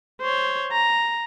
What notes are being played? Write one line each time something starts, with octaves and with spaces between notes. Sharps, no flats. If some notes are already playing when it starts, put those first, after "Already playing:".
C5 C#5
A#5